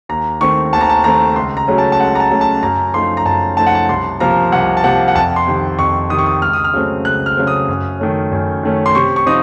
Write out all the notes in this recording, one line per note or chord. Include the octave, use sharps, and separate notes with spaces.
D#2 A#5
D#3 A3 C4 C#6
D#2 A5
A#5
A5
D#3 A3 C4 A#5
C#2 C6
A#5
C#3 F#3 A3 C#4
A5
A5
C#2 F#5
A#5
A5
C#3 F#3 A3 C#4
A5
F#2 A#5
F3 A3 D#4 C6
A#5
F#2 A5
F3 A3 D#4 A5
F#5
A5
C2 C6
C3 F3 A#3 A#5
C2 F#5
A5
C3 F3 A#3 F#5
F#5
F2 A5
C6
C3 D#3
F2 C#6
C3 D#3 D#6
C#6
D#6
C#2 F6
D#6
F6
C#3 F#3 A3 C4
C#2 F#6
F6
C#3 F#3 A3 C4
D#6
F#2
D#3 A3 C#4
F#2
D#3 A3 C#4
C6
C3 C#6
C#6
F3 C4 D#4 D#6